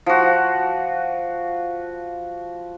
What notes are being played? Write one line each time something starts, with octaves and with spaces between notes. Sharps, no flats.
F3 F#4